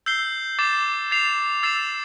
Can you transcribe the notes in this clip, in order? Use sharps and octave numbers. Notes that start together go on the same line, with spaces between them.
E6 G6 C7 G7
D6 A6 C7 E7
A6 C7 F7
E6 A6 C7 E7